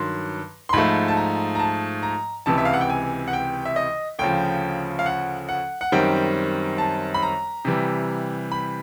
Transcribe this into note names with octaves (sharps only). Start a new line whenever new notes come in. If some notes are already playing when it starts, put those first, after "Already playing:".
Already playing: G2 D#3 F#3 C6
C6
G#2 F3 A3 B5
A5
A#5
A#5
A5
A#5
C#2 C3 E3 A5
E5
F5
F#5
G5
G#5
F#5
G5
E5
D#5
D2 C#3 F3 G5
F5
F#5
F#5
F#5
F#2 D#3 G3 C4 G5
A5
B5
A#5
C3 E3 G3
B5